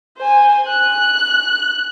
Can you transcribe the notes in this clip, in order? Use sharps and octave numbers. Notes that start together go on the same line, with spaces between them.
C5 G#5
F#6